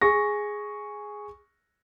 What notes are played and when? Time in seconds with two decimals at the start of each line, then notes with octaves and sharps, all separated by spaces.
0.01 G#4 C#6 A#6